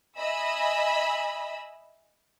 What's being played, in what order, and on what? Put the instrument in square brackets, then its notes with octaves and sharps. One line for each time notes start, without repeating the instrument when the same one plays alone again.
[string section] D#5 E5 G#5 B5 E6